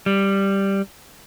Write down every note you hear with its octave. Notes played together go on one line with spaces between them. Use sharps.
G3